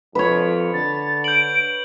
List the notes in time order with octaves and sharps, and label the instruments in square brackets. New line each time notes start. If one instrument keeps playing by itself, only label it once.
[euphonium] F2 [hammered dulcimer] B4 C#5
[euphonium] D3 [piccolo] A6
[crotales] G6 F#7 [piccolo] D7